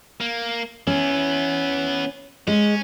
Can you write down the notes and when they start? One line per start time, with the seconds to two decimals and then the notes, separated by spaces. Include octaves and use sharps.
0.21 A#3
0.87 E3 B3 C#4
2.47 G#3 C#4